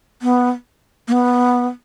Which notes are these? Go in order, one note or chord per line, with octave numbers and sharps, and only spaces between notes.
B3
A#3
B3